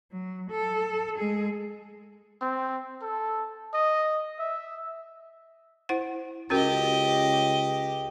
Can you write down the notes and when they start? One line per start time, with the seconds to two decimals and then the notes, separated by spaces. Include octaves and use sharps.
0.12 F#3
0.51 A4
1.19 G#3 G#4
2.41 C4
3.02 A4
3.74 D#5
4.39 E5
5.89 E4 C5 F#5
6.50 C#2 C#4 F#4 G4 A#4 D#5